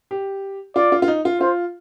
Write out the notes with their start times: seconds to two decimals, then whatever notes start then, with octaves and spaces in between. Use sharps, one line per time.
0.11 G4
0.76 F4 D5
0.92 F4
1.02 F4
1.08 D#4
1.25 F4
1.41 F4 C5